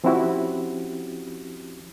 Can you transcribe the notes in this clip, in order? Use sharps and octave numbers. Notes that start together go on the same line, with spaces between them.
F3 C4 C#4 E4 F#4 G4